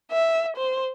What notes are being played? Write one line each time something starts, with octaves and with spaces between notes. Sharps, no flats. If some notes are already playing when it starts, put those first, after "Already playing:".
E5
C5